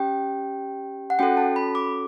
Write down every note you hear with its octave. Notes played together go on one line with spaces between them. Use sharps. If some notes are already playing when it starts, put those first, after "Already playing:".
Already playing: C#4 G4 G5
F#5
C#4 F#4 A4 G5
A5
B5
D6